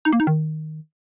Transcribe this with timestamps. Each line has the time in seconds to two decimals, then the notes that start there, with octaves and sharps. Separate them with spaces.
0.05 D#4
0.13 A#3
0.20 D#4
0.27 D#3